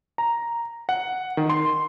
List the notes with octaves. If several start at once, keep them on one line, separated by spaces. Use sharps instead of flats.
A#5
F#5
D#3
C6